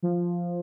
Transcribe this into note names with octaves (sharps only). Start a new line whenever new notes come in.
F3